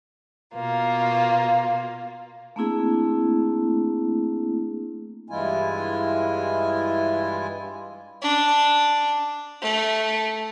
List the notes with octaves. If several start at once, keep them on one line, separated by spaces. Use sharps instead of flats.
B2 A#3 F4
A3 A#3 C4 D4 E4 G#4
G2 E3 G#3 E4 F4 G#5
D4
A3